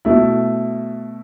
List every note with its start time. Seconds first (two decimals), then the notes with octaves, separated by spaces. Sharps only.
0.05 B2 A3 E4